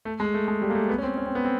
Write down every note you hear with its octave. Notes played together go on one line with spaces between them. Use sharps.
A3
G#3
A3
G#3
G3
A#3
A3
B3
C#4
C4
C#4
C4
B3
C4